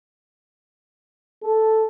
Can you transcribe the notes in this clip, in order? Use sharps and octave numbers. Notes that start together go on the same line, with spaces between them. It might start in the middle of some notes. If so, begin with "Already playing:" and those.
A4